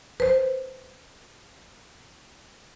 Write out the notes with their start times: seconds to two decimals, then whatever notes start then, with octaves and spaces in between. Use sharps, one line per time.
0.20 B4 C5